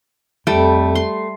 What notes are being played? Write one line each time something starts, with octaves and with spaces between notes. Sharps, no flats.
F2 G3 A3 G5
C6